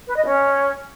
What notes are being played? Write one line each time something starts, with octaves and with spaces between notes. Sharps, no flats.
B4
D#5
C#4